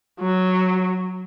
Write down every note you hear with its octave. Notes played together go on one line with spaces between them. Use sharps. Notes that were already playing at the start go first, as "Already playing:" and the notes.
F#3